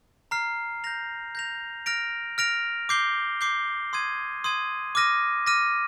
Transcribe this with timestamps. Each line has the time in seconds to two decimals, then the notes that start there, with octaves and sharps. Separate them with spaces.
0.31 A#5 F6 C7
0.84 G6 A#6 F7
1.35 G6 A#6 F7
1.86 F6 A#6 D7 F7
2.38 F6 A#6 D7 F7
2.89 D6 G6 C7 G7
3.41 D6 G6 C7 G7
3.93 C6 D#6 G#6 D#7
4.44 C6 D#6 G#6 D#7
4.95 D6 F6 A#6 D#7
5.46 D6 F6 A#6 D#7